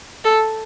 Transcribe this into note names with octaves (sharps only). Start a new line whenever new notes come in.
A4